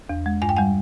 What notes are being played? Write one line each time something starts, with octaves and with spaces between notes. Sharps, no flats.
E2
G#3
G2 G#5
G5
G3 F#5 G#5